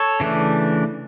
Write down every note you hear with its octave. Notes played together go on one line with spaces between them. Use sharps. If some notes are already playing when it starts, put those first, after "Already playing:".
Already playing: A4 C#5
C#3 E3 A3 D4